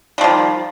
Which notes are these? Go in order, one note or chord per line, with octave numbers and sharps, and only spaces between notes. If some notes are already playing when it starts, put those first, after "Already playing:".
D#3 F3 G3